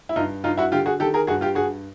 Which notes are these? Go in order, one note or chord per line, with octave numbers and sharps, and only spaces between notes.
E4
G2 D#4 F4
G2 D#4 F4
E4 F#4
D3 F4 G4
F#4 G#4
D#3 G4 A4
G#4 A#4
G2 F#4 G#4
F4 G4
G2 F#4 G#4